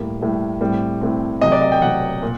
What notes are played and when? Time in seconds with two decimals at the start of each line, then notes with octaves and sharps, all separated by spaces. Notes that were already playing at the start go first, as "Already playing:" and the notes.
Already playing: A2 G3 A#3
0.20 A2 G3 A#3
0.61 A2 G3 C4
1.01 A2 G3 C4
1.41 C3 F#3 A3 D#5
1.52 D5
1.62 D#5
1.72 G5
1.82 C3 F#3 A3 F#5
2.22 A#2